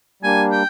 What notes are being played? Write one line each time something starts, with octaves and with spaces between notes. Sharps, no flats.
G3 A#3 D4 G#5
G5